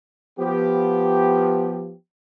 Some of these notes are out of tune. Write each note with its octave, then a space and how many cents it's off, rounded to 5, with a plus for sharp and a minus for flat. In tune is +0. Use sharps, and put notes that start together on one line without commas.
F3 +0 B3 +0 G4 +0